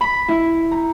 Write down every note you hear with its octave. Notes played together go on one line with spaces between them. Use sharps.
B5
E4
A#5